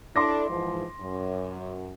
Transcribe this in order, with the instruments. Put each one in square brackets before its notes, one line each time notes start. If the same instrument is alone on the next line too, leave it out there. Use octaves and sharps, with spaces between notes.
[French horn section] D4 E4 A4 [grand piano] C6 D6 A#6
[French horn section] G#2 E3 F3
F#2